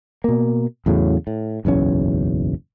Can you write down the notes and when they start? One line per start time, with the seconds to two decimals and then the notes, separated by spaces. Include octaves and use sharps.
0.24 B2 A#3
0.86 E2 A2 C#3 F#3
1.27 A2
1.65 F#1 B1 E2 C#4